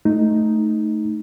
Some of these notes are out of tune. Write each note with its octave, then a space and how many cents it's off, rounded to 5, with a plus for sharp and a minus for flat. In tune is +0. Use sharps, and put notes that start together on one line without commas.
A3 +0 D#4 +0